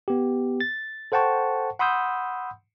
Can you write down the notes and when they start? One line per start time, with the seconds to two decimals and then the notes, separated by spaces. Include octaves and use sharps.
0.08 B3 G4
0.61 A6
1.12 A4 C5 F#5 G5 A5 C#6
1.79 F#5 B5 C6 D#6 E6 G6